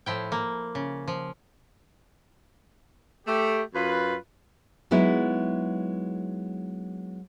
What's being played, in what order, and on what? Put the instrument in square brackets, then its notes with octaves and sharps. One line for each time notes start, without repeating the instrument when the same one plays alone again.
[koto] A2 F3 E4 G5
A#3
C#3
F3
[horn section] A3 G4
F#2 F4 B4
[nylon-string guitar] F#3 G#3 B3 D#4 E4